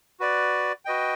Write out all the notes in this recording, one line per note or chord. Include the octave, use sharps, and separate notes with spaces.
F#4 B4 D5
F#4 B4 D#5 G5